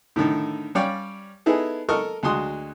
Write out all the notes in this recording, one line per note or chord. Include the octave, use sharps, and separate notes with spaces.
A2 D3 D#3 A5
G3 C#4 C#5 D5 F5 G5
B3 D#4 E4 G#4 A4
A4 A#4 D#5 C#6 F6
D2 G#3 F#4 C6 D#6